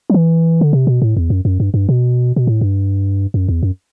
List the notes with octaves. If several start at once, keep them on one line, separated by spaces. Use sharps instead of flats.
F#3
E3
D3
C3
B2
A2
E2
F#2
F#2
G2
G2
B2
B2
A2
G2
F#2
E2
F#2